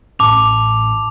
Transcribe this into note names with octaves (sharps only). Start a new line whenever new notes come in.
A1 A2 C#4 A5 D6 F7